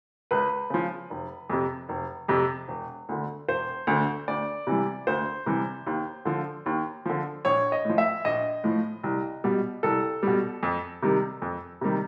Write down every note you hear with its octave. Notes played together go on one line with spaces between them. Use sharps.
C#2 B4
C#3 F3
F1
F2 C3
F1
F2 C3
E1
D2 D3
E1 C5
D2 D3
D2 D5
C3 E3 G3
D2 C5
C3 E3 G3
D#2
D3 F3
D#2
D3 F3
A#1 C#5
D#5
A2 F3
E5
A#1 D#5
A2 F3
C2
B2 G3
C2 A4
B2 G3
F2
C3 D#3 G3
F2
C3 D#3 G3